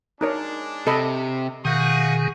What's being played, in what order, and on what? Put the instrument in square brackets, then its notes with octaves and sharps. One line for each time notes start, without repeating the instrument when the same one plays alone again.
[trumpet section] G#3 D4 [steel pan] D#4 A#4 C#5
[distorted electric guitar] C3 [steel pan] A4 D#5 B5
[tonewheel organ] B2 D#3 [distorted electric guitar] G#4 [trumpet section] F5 F#5 C#6